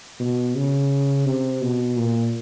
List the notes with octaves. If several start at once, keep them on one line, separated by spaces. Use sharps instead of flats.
B2
C#3
C3
B2
A#2